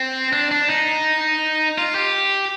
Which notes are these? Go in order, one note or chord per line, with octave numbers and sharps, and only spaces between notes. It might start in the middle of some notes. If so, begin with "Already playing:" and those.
Already playing: C4
D4
D4
D#4
F4
G4